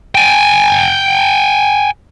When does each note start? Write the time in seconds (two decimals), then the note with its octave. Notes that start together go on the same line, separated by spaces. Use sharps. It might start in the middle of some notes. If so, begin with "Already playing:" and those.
0.15 G5 G#5